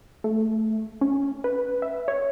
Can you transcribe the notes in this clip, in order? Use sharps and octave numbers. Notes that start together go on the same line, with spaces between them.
A3
C#4
B4
E5
C#5